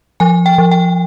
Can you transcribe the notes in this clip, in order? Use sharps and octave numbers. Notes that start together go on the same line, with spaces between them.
F3 G#5
G5
F3
G5